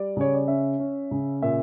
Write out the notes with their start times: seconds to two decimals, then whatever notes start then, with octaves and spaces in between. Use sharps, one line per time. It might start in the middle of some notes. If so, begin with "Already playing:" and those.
Already playing: G3 D5
0.17 C#3 C#5
0.34 D5
0.48 C#4 E5
0.80 C#4
1.11 C#3
1.42 A#2 E5